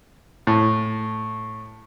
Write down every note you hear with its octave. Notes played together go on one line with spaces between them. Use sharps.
A2